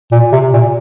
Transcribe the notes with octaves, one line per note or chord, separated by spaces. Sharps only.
A#2
C3
A#2